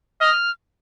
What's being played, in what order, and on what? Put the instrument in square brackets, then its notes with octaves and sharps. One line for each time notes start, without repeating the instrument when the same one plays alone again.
[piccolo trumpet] D#5 [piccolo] F6